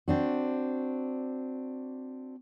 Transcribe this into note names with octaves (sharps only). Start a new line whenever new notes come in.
C4 D4 F#4